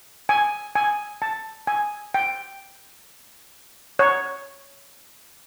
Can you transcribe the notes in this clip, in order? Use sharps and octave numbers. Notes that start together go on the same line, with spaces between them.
G#5
G#5
A5
G#5
G5
C#5